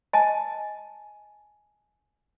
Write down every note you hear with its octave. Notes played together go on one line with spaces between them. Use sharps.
D#5 G#5 A5